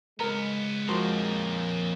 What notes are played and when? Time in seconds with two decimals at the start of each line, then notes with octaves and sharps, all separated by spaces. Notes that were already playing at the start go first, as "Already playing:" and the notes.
0.19 C#2 G#3 B3 A#4 A#5
0.89 F2 F3 A#3 D#4 F#4 A#4 C6